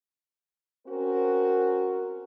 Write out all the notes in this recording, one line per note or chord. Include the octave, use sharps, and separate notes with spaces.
C4 C#4 F#4 A#4